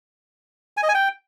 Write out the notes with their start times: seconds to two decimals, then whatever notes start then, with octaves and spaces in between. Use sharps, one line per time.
0.77 G#5
0.83 D#5
0.89 G#5
0.94 G5